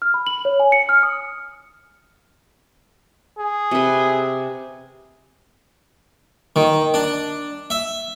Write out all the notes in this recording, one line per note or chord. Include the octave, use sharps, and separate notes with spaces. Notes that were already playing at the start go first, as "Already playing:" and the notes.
F6
B5
F#7
C#5
G#5
C#7
F6
D#6
G#4
C3 B4
D#3
D4
E5